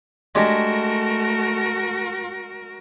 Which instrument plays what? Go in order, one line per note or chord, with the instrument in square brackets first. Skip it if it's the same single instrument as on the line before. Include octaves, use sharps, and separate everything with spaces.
[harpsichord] G#3 D4 G4 [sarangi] A3 [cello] F#4 A#4